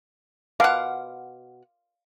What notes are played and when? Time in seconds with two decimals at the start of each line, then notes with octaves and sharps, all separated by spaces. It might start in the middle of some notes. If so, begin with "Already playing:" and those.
0.60 B2 F5 F#5 D6